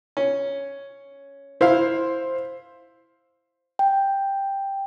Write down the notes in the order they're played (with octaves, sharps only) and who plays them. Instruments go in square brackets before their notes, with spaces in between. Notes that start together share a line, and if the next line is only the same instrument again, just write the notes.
[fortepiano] C#4
[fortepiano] E4 F5 [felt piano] C5
[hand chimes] G5